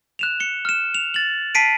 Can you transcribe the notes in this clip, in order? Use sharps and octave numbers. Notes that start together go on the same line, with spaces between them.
F#6 E7 F7
C#7 G7
F6 E7
F7
A6 F#7
A5 B6 C7 D7 D#7